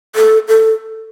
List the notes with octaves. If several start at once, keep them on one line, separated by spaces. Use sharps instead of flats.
A4
A4